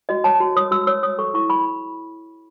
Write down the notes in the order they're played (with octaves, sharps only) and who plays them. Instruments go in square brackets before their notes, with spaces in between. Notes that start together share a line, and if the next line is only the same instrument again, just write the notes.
[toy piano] F#4 D#5
C#5 A5
F#4
C#5 D#6
F#4 E6
C#5 E6
C#5 D#6
A4 C#6
E4 C#6
E4 B5